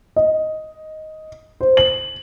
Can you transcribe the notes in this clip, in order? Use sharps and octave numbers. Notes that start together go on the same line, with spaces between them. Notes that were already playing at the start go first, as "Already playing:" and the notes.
D#5
C5
F#7